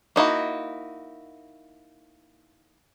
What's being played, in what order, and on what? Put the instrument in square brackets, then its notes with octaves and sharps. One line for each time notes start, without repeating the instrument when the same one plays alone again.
[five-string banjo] A#3 D#4 E4 F#4